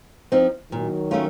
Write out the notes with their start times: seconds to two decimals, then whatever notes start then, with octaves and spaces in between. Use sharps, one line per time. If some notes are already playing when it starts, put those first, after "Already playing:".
0.32 F3 C4 D#4
0.72 A#2 D#3 F#3
1.11 A3 C#4 F4 A#4